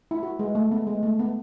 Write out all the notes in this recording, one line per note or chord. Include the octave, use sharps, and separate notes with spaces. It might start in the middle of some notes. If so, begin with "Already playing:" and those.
E4
F#4
G#3
A3
B3
G#3
A3
B3